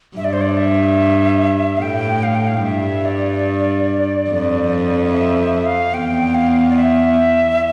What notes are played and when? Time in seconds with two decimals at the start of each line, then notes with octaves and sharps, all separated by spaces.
0.16 G2 E5
0.24 D5
0.33 C5
0.41 D5
0.57 E5
1.77 F5
1.81 A2 G5
2.23 F5
2.35 G5
2.47 F5
2.64 G2 E5
3.05 D5
4.29 F2
5.11 E5
5.39 E5
5.54 E5
5.66 F5
5.94 E2 G5
6.34 F5
6.70 D5
6.76 E5